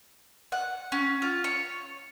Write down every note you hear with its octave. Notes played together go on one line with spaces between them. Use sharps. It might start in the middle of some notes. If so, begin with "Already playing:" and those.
F#5
C#4
F4
C#5